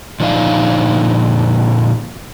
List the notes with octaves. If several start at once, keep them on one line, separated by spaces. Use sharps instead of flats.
A#2 D3 F3 D#4 D5 F5